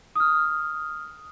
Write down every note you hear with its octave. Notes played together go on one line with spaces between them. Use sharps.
D#6 F6